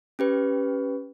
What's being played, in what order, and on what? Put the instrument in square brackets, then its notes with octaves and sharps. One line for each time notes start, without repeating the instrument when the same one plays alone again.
[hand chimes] C#4 G4 B4